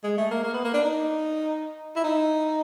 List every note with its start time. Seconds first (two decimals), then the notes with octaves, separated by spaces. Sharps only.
0.03 G#3
0.17 A3
0.31 A#3
0.43 A#3
0.53 B3
0.64 A#3
0.74 D4
0.84 D#4
1.96 E4
2.04 D#4